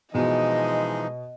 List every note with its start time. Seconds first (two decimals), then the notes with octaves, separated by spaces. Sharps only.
0.14 B2 E3 F3 G#3 D#4 D#5